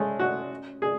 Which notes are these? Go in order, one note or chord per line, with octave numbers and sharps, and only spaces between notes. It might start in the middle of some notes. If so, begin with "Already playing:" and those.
Already playing: G#3 A3 C#4
F#4
G#4